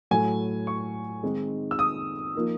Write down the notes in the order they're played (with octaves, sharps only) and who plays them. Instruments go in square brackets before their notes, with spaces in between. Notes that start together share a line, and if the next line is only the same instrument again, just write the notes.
[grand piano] A2 F#3 A3 G#5
C#6
D#3 G#3 C4 D#4
E6
D#6
F3 A#3 D#4